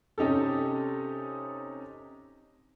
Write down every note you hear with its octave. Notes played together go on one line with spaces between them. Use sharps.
C3 C#4 D#4 G4 A4